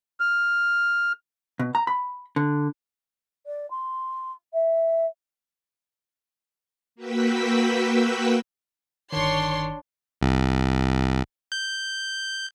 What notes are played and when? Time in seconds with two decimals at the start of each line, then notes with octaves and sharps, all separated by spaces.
0.20 F6
1.59 B2
1.75 A#5
1.87 B5
2.36 D3
3.47 D5
3.71 C6
4.53 E5
6.95 A#3 F#4 B4 G5 E6 B6
9.12 G1 D#3 D4 C#5 C6
10.21 C2
11.52 G6